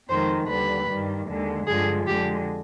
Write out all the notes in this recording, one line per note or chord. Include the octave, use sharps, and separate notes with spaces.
F2 D#3 G#3 C5
D#2 D3 G3 B4
G2 D#3 G3
D#2 D3 G#3
G2 D3 F3 G#3 G#4
F2 D3 G#3 G4